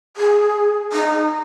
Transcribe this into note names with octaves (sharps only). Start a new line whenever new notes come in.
G#4
D#4